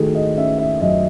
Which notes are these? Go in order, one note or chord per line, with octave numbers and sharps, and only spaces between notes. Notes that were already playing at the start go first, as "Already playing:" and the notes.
Already playing: D#3 A3 F#4 G#4 A4
D#5
C#4 E5
E5
F#2 D#5